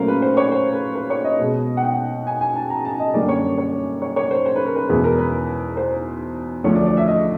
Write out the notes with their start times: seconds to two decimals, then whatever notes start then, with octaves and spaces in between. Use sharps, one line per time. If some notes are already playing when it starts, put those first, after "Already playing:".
Already playing: A#2 F#3 A3 C#4 A#4 C5 F5
0.08 B4
0.22 C5
0.37 C#5
0.52 C5
0.73 B4
0.95 B4
1.10 C#5
1.24 D#5
1.39 B2 G#3 B3
1.77 F#5
1.83 G5
2.27 G#5
2.41 G#5
2.56 A5
2.70 A#5
2.85 A5
3.00 D#5
3.14 F#2 D3 G3 A#3 C#4 D5
3.29 C#5
3.58 C#5
4.02 C#5
4.16 C#5
4.31 C5
4.46 C5
4.56 B4
4.66 A#4
4.76 B4
4.89 E2 B2 G#3 B3 B4
5.04 A#4
5.18 B4
5.77 C5
6.64 D2 D3 F3 C#5
6.75 D5
6.86 D5
6.97 E5
7.07 D#5